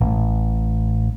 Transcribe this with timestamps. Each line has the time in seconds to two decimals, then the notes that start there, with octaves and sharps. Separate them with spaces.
0.01 A1 A2